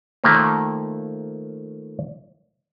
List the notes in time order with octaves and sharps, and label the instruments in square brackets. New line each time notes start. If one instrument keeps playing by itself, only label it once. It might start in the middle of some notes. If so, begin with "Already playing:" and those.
[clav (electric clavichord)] D#3 F3 A3 A#3